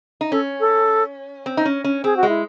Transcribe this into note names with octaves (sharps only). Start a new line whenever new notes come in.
D#4
C#4 A4
A4
C4
D#4
C#4
C#4
C4 G#4
F#4
G#3
E4